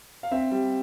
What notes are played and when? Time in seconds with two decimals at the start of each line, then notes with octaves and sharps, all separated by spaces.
0.23 F5
0.31 C4 E5
0.51 G3